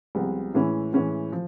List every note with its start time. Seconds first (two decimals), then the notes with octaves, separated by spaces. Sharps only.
0.15 C2 C3 F3 G#3 B3
0.54 A2 E3 G#3 C#4 E4
0.93 A2 E3 G#3 C#4 E4
1.32 F3